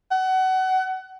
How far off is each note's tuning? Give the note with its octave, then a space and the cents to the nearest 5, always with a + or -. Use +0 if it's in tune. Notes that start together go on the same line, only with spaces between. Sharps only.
F#5 +25